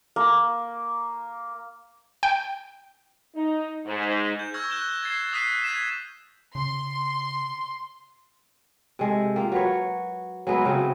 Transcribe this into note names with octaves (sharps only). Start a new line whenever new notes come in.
A#3
G5
D#4
G#2
G6
C#6 E6 F6 G6 G#6 A#6
F#6 G6 E7 G7
G#6 A6 C7 E7
D#6 F#6 B6 C7 D#7
G#6 B6 D#7 E7
C#3 C6
C3 G#3 A4
A#3 F4 G4
F#3 B4 C#5
F#3 G#3 B3 E4
C#3 F#3 B3 C4